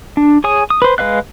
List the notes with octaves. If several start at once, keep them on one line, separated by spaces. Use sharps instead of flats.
D4
G#4 C#5 G#5 D#6
D#6
B4 C5
G#3 B4 E5 F5 F#6